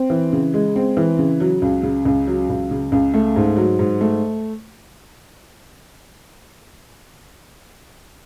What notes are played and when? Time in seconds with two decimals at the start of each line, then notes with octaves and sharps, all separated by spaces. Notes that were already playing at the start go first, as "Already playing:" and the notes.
Already playing: C4
0.10 E3
0.33 C#3
0.54 G#3
0.76 C4
0.97 E3
1.19 C#3
1.40 F#3
1.62 C#2
1.83 C#3
2.05 C#2
2.27 F#3
2.49 C#2
2.71 C#3
2.92 C#2
3.14 A3
3.36 G#2
3.57 F#3
3.79 G#2
4.01 A3